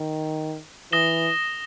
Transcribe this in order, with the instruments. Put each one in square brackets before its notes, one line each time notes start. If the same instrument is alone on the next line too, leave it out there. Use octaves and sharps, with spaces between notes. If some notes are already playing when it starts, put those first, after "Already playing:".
Already playing: [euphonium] D#3
[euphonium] E3 [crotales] D#6 A#6 E7 G7